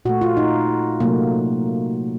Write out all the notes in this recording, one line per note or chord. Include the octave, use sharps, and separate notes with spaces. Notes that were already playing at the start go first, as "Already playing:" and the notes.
A#2 A3 F#4
F4
D#4
C3 F#3 A3 A#3